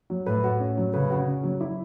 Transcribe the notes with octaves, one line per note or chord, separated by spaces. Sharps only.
F#3
A2 B4
F#4
C#4
F#3
C#3 B4
F#4
C#4
F#3
E4